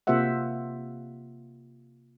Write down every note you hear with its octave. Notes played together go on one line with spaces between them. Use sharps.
C3 A#3 F4 C5 E5 F#5